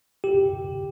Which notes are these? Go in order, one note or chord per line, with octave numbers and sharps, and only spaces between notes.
G4